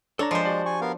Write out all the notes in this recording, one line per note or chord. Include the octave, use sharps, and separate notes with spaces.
D4 A4 C#5 A#5
F3 G#3 C5
F#4 G4 D5
G#5 C#6
B3 A#4 F5